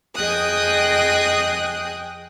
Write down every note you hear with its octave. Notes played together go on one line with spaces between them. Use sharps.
F2 G#4 D#5 G5 D#6 F#6